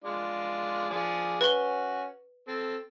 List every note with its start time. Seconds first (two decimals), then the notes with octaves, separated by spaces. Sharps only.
0.04 G#3 D4 F4
0.90 F3 D4 G#4
1.41 C#4 F#4 B4 G7
2.48 C4 A4